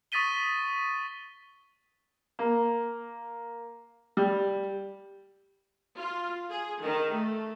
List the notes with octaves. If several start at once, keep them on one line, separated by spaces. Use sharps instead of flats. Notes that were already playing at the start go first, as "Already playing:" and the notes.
C#6 D#6 A6 B6 D#7 G7
A#3
G3
F4
G#4
D#3
A3